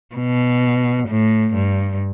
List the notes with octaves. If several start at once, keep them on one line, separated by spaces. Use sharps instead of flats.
B2
A2
G2